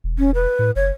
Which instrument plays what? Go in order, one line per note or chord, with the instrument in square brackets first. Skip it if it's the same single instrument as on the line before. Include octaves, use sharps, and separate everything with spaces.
[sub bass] E1
[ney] C#4
B4
[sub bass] A2
[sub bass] F#1 [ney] C#5